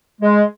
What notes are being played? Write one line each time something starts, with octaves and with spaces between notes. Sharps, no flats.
G#3